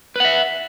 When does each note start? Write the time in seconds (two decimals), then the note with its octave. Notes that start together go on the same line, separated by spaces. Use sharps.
0.16 B4
0.20 F#5
0.25 E5